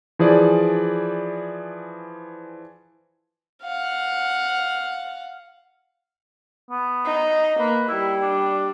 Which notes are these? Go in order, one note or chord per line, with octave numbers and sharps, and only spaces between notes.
E3 F3 G#4 D5
F5 F#5
B3
D#4
A#3 B4
G3 E4
D4